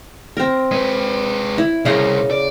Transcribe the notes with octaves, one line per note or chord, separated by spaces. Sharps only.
C4 A#4
G#3 B4
E4
C2 C#3 D#5 F5
D5